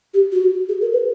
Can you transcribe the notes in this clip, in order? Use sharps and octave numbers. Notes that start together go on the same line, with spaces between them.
G4
F#4
G#4
A#4
B4